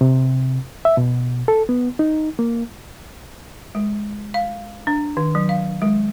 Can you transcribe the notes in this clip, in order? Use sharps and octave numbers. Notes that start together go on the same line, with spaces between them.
C3
E5
B2
A4
B3
D#4
A#3
G#3
F5
D4
D#3
F#3
F5
G#3